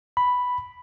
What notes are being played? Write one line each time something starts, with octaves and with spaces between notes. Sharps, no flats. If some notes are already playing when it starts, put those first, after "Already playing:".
B5